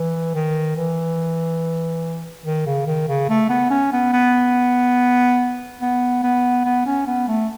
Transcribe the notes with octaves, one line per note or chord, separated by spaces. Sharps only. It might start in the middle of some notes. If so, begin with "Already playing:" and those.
Already playing: E3
D#3
E3
D#3
C#3
D#3
C#3
A3
B3
C#4
B3
B3
B3
B3
B3
C#4
B3
A3